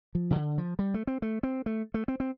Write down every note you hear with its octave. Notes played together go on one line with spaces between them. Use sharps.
F3
C3
D3
F3
G3
A3
C4
A3
C4
A3
A3
C4
C4